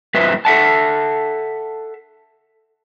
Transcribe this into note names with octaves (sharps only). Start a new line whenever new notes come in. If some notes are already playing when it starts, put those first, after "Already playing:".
F#2 A2 B4 C5 E5
A4 E5 F#5 A5